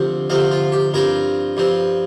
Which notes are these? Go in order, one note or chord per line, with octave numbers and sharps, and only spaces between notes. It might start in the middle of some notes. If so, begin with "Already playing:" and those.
Already playing: D2 C3 F3 C4
D2 C3 F3 C4 F5
F4
G4
G2 F3 C4 A#4
G2 F3 C4